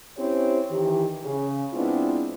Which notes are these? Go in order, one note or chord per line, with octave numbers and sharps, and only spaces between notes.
C4 C#4 E4 G4 C5 C#5
D#3 E3 G4
C#3
G#3 B3 C4 D4 E4 F4